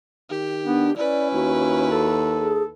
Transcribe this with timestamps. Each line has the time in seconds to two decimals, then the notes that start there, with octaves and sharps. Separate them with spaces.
0.30 D#3 G4
0.65 B3 D4
0.97 C#4 E4 B4 D5
1.33 D#2 F#4
1.91 A4
2.39 G#4